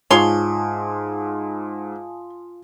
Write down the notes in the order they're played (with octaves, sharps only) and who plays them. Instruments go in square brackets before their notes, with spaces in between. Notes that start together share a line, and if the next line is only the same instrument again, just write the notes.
[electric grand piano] G#2 [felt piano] F4 [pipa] C#5 C6 [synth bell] G#5 A5 D#6